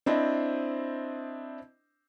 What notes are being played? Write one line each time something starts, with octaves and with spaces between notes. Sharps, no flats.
C4 D4 E4 C5 D#5